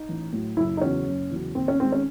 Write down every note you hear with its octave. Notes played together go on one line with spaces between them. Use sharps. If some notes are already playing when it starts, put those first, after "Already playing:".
Already playing: D#4
A1
A2 F#3
F#1 E4
D#4
E2 C#3 F#3 C#4
F#1
E2 C#3 F#3
D#2 C4
C#4
D#3 G#3 C4
C#4